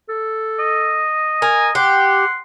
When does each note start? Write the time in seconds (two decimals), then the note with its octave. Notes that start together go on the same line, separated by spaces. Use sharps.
0.09 A4
0.59 D#5
1.42 A#4 G#5
1.75 G4 F#5 C6